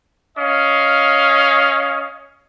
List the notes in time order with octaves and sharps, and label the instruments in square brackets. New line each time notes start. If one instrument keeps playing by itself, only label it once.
[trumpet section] C#4 D#5 F5